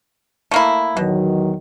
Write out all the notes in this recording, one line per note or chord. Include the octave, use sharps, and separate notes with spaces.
A3 A#3 E4
E2 B2 D#3 F#3